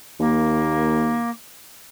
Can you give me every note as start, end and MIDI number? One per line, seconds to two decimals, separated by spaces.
0.20 1.22 39
0.20 1.30 58